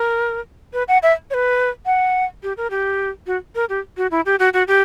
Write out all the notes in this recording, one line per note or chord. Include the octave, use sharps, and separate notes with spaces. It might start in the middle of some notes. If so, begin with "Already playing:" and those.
Already playing: A#4
B4
F#5
E5
C#5
B4
F#5
G4
A#4
G4
F#4
A#4
G4
F#4
E4
G4
F#4
F#4
G4